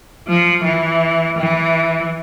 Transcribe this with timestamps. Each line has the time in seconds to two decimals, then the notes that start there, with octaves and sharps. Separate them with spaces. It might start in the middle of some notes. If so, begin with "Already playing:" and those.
0.28 F3
0.65 E3
1.38 E3